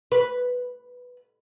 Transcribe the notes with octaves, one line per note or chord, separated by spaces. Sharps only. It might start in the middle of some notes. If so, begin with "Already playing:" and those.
B4